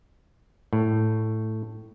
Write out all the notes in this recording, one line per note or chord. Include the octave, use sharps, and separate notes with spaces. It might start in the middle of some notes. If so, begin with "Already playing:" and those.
A2